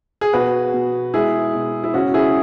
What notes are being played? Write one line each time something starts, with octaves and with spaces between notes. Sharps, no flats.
G#4
B2 F#4 B4
B2
G#3 E4 G#4
B2
E4
C#3 C#4 F#4
E4 G#4